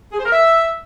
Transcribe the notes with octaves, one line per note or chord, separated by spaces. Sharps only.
G#4
C5
A#4
E5